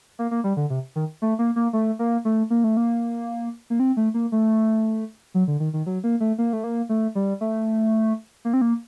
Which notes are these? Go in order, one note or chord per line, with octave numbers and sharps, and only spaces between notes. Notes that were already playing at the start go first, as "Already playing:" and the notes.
A#3
A#3
G3
D3
C3
D#3
A3
A#3
A#3
A3
A#3
A3
A#3
A3
A#3
A#3
C4
A3
A#3
A3
F#3
D3
D#3
D#3
F#3
A#3
A3
A#3
A3
A#3
A3
G3
A3
A#3
C4
A#3